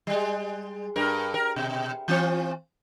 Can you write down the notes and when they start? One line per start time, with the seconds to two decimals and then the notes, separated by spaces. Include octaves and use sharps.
0.07 G3 G#3
0.96 G2 A#4
1.34 A#4
1.56 B2
2.08 E3 C4 F4